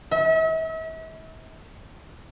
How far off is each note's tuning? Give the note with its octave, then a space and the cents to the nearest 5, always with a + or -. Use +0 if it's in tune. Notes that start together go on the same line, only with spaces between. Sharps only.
E5 -40